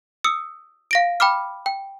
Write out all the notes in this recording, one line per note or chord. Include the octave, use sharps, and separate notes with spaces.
D#6 E6 C#7
F5 A#6 D7
G5 B5 D6 F6
G5